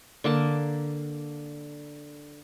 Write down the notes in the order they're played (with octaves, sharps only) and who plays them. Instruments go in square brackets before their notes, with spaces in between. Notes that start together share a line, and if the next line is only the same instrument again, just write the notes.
[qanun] D3 A#3 A5